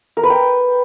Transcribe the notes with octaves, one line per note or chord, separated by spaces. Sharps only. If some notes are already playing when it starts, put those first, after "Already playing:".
A#4
B4
G5